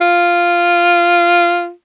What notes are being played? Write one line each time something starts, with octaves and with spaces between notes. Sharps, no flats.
F4